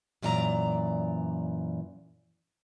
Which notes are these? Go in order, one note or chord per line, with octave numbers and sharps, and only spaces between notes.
F#2 A#2 E3 D5 A#5